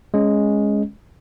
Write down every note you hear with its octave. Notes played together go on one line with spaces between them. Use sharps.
G#3 C#4